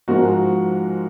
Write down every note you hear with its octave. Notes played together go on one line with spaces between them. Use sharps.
G#2 F3 G#3 F#4 A#4